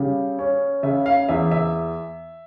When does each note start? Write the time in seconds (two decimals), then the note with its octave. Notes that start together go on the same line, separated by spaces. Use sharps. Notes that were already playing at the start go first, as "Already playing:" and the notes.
Already playing: C#3 G3
0.39 C#4
0.83 C#3 E5
1.06 F5
1.29 E2 E5
1.51 E5